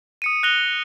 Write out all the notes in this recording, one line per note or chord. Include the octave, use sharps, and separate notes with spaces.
D#6 C#7 D#7
F#6 A#6 F7 G7